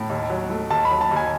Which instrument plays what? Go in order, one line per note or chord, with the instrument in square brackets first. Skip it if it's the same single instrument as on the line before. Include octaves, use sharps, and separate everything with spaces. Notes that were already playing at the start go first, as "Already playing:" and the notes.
Already playing: [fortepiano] A2
D#2
F#3
A3
[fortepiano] D#2 [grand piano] A5
[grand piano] B5
[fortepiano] F#3
[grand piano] A5
[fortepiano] D#2
[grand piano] G#5